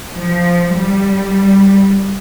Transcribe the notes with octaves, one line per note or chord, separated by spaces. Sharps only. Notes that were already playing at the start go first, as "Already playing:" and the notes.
F3
G3